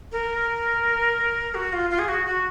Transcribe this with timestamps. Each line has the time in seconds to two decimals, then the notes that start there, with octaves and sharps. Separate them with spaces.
0.12 A#4
1.55 F#4
1.73 F4
1.90 F4
1.99 G#4
2.08 F#4
2.26 F#4